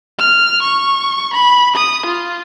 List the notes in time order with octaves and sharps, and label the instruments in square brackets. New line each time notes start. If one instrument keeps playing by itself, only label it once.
[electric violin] F6
C#6
B5
D#6
F4